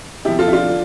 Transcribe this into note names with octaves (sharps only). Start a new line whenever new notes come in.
E2 C3 F3 E4 G4
F4 A4
E4
D4 F4
D3